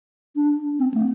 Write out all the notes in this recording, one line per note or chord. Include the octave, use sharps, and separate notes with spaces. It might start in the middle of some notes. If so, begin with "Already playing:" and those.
D4
C4
A3